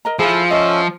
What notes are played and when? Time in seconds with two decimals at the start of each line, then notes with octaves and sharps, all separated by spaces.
0.05 A#4 D#5 A#5
0.19 F3 E4 F4 G#4 A4
0.50 C#4 A4 D#5 E5